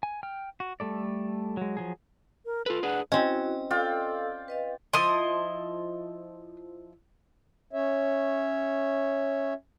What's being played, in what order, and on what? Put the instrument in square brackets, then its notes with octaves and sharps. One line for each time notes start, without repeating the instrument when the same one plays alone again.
[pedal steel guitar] G#5
G5 F6
F#4
G3 A3 A4 D5
F#3 G#3
F3 F#3 G#4
[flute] A#4
[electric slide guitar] F4 B4 [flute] A4
[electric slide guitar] D4 G#4 B4 [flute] F#5
[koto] C4 C#4 [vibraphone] E4 F#4 [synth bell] D#5
[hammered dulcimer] F4 D5 G5 [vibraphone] A4 F5 E6
[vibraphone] B4 D#5 F5
[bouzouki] F3 E4 D#5 [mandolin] C6 D#6
[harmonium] C#4 C#5 E5